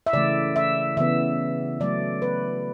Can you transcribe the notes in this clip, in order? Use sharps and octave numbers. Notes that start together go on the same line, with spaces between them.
E5
C#3 E3 A3 D5
E5
C#3 E3 B3 E5
C#3 F#3 A3 D5
B4